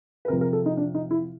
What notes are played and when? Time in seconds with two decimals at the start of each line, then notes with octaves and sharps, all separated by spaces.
0.25 B4
0.28 C3 F3 A#4
0.41 A#4
0.53 A4
0.66 D#4
0.77 D4
0.94 D#4
1.11 E4